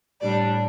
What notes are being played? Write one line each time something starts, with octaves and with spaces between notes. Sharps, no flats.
A2 G3 D4 D5